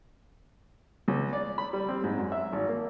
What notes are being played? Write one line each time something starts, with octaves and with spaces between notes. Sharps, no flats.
C#2
D5
B5
G3
C4
G#2
F#2
E5
G#1
A#3